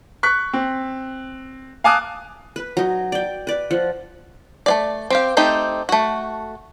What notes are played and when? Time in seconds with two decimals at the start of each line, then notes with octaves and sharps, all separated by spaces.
0.23 C#6 F#6 B6
0.53 C4
1.84 F5 G#5 A5 D6 D#6 F#6
2.56 B4
2.77 F#3 D#4
3.12 D5 G5
3.47 B4 D5
3.71 F3 F#5
4.66 A3 C4 D5
5.10 C4 G4 F5
5.37 A3 C4 D#4 G4
5.89 A3 F#4